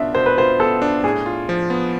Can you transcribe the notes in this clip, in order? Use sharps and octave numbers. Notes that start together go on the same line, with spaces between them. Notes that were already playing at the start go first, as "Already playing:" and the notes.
Already playing: B2 B3 D4 F4 E5
B2 C5
B4
F4 C5
B3 A4
D4
A2 G#4
F4
F3
B3